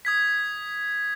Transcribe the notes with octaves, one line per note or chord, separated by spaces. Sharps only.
D#6 G#6 B6